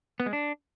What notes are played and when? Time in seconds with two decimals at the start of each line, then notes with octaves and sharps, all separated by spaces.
0.20 B3
0.26 G#3
0.33 D4